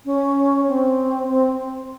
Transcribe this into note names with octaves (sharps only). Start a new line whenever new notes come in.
C#4
C4
C4